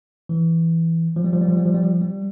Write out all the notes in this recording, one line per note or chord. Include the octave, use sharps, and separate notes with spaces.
E3
F3
G3
F3
G3
F3
G3
F3
G3
F3
G3